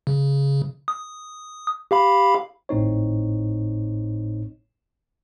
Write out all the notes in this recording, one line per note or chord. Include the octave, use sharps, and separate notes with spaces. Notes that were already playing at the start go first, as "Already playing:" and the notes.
C#3
D#6
G4 F5 B5
G#1 A2 C4 D#4 C#5